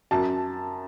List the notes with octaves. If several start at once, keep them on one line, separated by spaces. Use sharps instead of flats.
F#2 A5